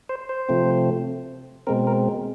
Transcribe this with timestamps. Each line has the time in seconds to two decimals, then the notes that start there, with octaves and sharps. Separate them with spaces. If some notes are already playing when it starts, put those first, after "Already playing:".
0.09 C5
0.29 C5
0.49 C3 F3 A3 C4
1.67 B2 G#3 C4 A#4
1.87 A#4